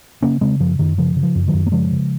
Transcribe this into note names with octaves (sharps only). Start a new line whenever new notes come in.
C#3 A#3 C#4
C#3 G#3 C4
F#2 F3
F#2 D#3
C#3 F3
C#3
F3
F#2
D#3 F#3
F#2
A#3
C#3 F3 G#3
C#3